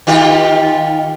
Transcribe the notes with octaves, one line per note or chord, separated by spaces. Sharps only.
D#3 F4 G4